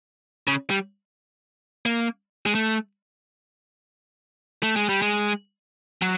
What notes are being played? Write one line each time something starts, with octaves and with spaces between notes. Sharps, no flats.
C#3
G3
A#3
G#3
A3
A3
G#3
G3
G#3
F#3